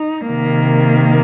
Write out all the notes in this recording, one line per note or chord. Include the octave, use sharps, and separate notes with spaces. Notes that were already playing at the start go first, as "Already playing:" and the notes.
Already playing: D#4
C3 D#3 A#3